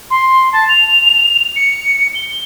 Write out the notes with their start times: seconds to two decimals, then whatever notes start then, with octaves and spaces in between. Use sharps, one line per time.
0.10 C6
0.52 A5
0.68 F7
1.56 C#7
2.14 G7